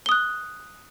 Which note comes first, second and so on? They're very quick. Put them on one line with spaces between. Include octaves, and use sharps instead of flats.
G7 D#6 F#6